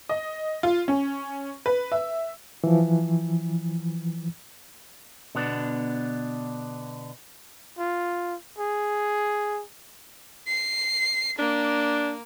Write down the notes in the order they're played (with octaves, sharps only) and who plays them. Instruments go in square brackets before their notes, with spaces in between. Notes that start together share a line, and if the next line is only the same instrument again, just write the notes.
[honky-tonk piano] D#5
F4
C#4
B4
E5
[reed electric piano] E3 F3
[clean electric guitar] B2 D3 B3 D4
[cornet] F4
G#4
[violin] C7
[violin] A#3 [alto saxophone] D4